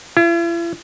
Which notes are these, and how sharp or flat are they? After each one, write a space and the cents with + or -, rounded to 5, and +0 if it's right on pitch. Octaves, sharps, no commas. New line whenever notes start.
E4 +45